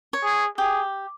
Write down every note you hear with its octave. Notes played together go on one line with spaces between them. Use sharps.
C#5
G#4
G4 G#4